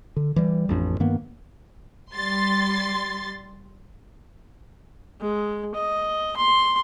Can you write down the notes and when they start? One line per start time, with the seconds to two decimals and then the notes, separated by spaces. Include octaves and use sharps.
0.16 D3
0.36 E3 G3
0.69 A1 F2 D4
1.00 G2 D#3 A#3 B3
2.14 G3 C6 A6
5.21 G#3
5.75 D#5
6.37 C6